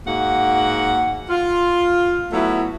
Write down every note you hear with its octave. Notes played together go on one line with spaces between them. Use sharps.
G#2 A#3 F#4 F#5
F4
F#3 A3 B3 E4